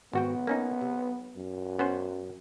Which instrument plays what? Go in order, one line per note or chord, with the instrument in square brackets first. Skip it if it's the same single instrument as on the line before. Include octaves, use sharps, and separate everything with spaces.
[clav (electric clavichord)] G#1 F#4 G5 [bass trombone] B3
[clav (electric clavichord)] A#3 C#4 D#4
C3
[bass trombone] F#2
[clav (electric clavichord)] B3 C#4 C5